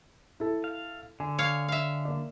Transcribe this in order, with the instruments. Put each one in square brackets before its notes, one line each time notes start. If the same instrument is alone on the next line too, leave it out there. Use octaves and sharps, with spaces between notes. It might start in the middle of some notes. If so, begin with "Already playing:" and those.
[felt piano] E4 A4
[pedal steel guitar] F5
[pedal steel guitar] D3 [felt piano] G#5
[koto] C#5 F5
E5 F5
[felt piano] A#3 D5